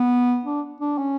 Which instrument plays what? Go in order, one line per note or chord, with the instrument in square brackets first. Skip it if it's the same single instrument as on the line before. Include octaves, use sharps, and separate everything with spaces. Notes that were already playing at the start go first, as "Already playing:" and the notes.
Already playing: [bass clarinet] B3
D4
D4
C#4